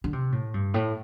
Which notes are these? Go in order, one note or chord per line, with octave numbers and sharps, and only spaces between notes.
D3
C3
A2
G2
A2